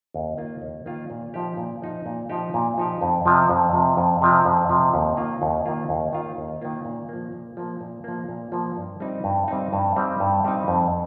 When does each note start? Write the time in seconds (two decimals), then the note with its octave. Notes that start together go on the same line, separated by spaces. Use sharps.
0.14 D#2
0.37 D#3 A#3 F4
0.62 D#2
0.86 D#3 A#3 F4
1.10 A#2
1.34 F3 D#4 G4
1.57 A#2
1.82 F3 D#4 G4
2.06 A#2
2.29 F3 D#4 G4
2.54 A#2
2.78 F3 D#4 G4
3.01 F2
3.26 C3 F3
3.49 F2
3.73 C3 F3
3.97 F2
4.22 C3 F3
4.45 F2
4.69 C3 F3
4.94 D#2
5.17 D#3 A#3 F4
5.42 D#2
5.66 D#3 A#3 F4
5.89 D#2
6.13 D#3 A#3 F4
6.37 D#2
6.61 D#3 A#3 F4
6.85 A#2
7.09 F3 A#3
7.32 A#2
7.57 F3 A#3
7.81 A#2
8.04 F3 A#3
8.29 A#2
8.52 F3 A#3
8.77 G2
9.00 G3 C4 D#4
9.24 G2
9.48 G3 C4 D#4
9.73 G2
9.96 G3 C4 D#4
10.20 G2
10.44 G3 C4 D#4
10.68 F2